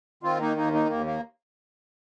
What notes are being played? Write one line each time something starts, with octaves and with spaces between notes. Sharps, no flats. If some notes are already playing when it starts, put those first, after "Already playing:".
D#3 C4 F4
A#3 D#4
D#2 A#3 D#4
A#3 D#4
D#2 A#3
A#3